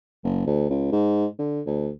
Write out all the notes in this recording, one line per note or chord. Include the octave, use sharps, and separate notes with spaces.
F#1
D2
C#2
G#2
D3
D2